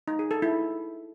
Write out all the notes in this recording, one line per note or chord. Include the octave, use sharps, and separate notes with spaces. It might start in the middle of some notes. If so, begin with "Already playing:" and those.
D#4
G#4
A4
E4